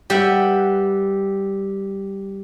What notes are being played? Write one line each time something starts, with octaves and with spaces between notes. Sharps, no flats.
G3 G4 B4 E5 F#5